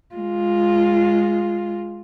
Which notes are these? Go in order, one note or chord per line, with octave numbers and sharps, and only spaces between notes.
G#3 F4